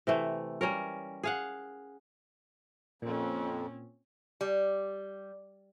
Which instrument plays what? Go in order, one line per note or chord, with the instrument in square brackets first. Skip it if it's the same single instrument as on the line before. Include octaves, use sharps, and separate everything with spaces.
[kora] C3 E3 A3
G3 C#4 A#4
G#4 F5 F#5
[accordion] F2 [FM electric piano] A#2 [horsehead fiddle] C4 C#4
[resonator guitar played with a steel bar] G3